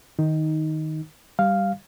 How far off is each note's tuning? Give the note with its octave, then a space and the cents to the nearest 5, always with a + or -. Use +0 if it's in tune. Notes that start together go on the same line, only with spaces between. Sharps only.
D#3 +0 D#4 +10
G3 +0 F5 +0